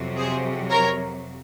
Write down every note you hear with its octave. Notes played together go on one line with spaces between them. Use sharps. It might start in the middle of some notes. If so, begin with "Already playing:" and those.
Already playing: F2 C3 F#3
G#4 C5
A#4 C#5